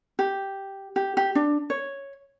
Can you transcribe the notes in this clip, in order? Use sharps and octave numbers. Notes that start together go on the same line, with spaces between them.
G4
G4
G4
D4
C#5